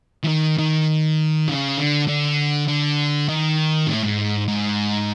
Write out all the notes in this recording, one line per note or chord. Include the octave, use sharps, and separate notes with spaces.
E3
D#3
D#3
C#3
D3
D3
D3
D#3
A2
G#2
G#2